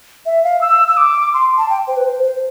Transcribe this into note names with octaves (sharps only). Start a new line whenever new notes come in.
E5
F5
E6
E6
D6
C6
A5
G5
C5
B4
C5
C5